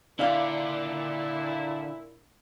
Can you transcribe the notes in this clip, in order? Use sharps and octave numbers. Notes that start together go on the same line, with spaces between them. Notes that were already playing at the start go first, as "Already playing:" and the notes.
A#2 D3 D4 E4 D5 E5 F5